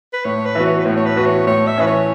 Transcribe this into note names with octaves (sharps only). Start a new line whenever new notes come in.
B4
A2 C#5
B4
E3 B3 F#4
C#5
B4
A2 C#5
C#5
B4
E3 B3 F#4
C#5
A2 C#5
E5
E3 C#4 B4
C#5